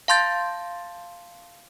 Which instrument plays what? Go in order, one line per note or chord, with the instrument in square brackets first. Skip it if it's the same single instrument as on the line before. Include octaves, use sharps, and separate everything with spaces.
[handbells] F5 A5 C6 G6 A6